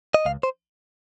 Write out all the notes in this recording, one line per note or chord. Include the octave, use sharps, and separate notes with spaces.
D#5
C#2 F5
C5